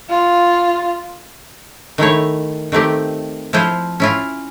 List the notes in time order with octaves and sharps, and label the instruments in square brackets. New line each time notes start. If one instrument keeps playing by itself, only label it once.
[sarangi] F4
[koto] D#3 A3 E4 C#5
D#3 A3 C4 G4
F3 E4 F4 C5
C#4 E4 F4